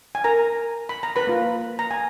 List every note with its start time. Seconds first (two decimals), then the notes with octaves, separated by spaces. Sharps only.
0.15 G#5
0.24 A#4 A#5
0.89 B5
1.03 A#5
1.16 B4 B5
1.27 A#3 F4
1.79 A#5
1.91 G#5